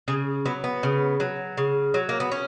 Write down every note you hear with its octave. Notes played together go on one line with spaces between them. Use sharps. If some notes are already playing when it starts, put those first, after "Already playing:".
C#3 G#4
F#3 B3
B3
C#3
F#3
C#3
F#3
A#3
B3
C#4